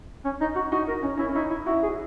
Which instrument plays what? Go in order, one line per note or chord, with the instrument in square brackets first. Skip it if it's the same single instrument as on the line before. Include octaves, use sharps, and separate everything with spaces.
[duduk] C#4
D#4
F#4
[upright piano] D#4 [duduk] F#4
[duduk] A#4
[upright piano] C#4
[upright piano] C#4 [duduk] E4
[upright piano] C#4
[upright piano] D#4 [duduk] E4
[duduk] E4
[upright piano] E4 [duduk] F#4
[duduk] G#4